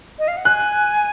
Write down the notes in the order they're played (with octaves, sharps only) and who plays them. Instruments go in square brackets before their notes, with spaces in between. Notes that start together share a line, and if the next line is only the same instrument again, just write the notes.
[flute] D#5
F5
F#5
[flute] G#5 [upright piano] F#6